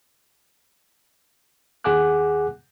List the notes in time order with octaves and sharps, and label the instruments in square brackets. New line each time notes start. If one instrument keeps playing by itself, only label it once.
[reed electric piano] D#2 G#4 F#5 G#5 D6 F#6